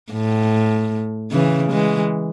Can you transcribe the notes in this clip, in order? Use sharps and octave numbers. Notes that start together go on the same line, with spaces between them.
A2
C#3 E3
E3 G#3